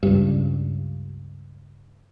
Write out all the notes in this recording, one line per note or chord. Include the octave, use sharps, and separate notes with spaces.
C#2 G2